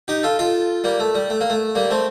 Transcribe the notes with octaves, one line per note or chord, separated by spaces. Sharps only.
D#4 G4
F4 A4
F4 A4
G3 A#3
A3
G3
A3
A#3
A3
G3 A#3
A3 C4